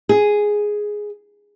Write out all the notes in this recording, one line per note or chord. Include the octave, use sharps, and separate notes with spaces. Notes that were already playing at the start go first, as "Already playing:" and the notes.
G#4